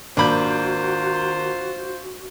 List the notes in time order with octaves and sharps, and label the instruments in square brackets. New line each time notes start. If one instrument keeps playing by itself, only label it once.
[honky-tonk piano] G#1 A#3 G6 [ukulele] D4 B5 [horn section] F4 C5 [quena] F#4